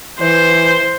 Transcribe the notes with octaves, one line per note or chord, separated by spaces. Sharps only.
E3 C5